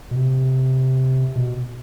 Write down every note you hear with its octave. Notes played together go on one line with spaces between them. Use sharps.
B2
C3
B2